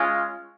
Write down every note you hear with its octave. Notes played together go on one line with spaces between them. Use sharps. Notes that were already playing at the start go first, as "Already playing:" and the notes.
Already playing: G#3 C#4 F4